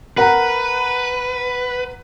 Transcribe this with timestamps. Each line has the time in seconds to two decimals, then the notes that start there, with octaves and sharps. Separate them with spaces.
0.17 A#4 B4 F#5 A#5